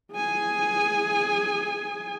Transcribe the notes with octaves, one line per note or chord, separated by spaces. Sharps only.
G#4 G#5